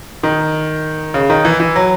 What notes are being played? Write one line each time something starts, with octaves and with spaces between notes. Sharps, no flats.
D#3
C#3
D#3
E3
E3
F#3